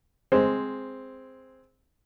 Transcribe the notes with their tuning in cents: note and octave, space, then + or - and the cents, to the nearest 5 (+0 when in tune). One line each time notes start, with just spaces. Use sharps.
G#3 +0 C4 +0